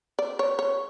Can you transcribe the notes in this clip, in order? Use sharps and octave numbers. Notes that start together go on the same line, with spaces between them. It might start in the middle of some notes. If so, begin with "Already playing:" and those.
D5
C#5
C#5